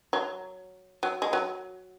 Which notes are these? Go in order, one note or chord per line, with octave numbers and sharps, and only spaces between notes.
F#3
F#3
G#3
F#3